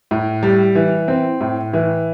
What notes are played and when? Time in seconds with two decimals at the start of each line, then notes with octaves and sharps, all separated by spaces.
0.11 A2
0.43 G3
0.75 E3
1.08 C4
1.41 A2
1.73 E3